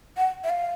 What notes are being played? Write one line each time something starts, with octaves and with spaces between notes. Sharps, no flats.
F#5
E5
F5